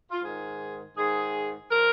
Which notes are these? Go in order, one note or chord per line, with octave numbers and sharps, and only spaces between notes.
F4
G#2 D#3 G#4
G#2 D#3 G#4
F3 A#4